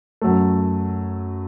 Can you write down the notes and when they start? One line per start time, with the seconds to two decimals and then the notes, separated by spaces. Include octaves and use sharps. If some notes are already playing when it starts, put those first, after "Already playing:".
0.22 F#2 F#3 A3